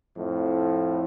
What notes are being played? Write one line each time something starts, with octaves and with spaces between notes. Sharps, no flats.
F2 A2